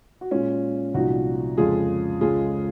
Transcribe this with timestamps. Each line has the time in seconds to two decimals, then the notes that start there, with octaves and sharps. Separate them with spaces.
0.21 F#4
0.31 A#2 G#3 C#4 F4
0.94 C2 A#2 F3 D#4 F#4
1.58 F2 C#3 G#3 F4 G#4
2.21 C#2 C#3 G#3 F4 G#4